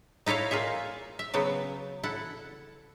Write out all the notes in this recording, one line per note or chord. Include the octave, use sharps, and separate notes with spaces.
D#4 E4 A4 C#5 F5
A#3 F4 G#4 E5
E5
C#3 F#3 B3
E4 A4 F#5